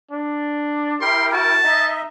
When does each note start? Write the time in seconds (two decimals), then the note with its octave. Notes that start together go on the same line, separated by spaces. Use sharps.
0.11 D4
1.01 E4 G4 A#4 G5 C6
1.33 F#4 A5
1.64 D#4 D#5 E5